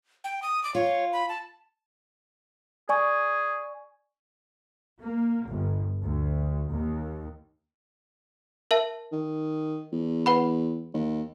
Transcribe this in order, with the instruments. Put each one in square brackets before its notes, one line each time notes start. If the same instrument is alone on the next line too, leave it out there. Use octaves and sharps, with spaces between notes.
[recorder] G5
D#6
D6
[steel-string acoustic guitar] F4 [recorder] C#5
[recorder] B5
A5
[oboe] G#4 [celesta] D5 G#5 C#6
[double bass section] A#3
G1
D2
D#2
[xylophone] A#4 E5 A5
[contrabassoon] D#3
E2
[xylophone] B4 F#5 B5
[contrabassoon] D#2